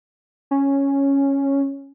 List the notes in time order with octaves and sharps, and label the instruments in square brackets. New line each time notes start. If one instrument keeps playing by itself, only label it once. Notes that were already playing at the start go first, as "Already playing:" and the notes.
[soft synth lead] C#4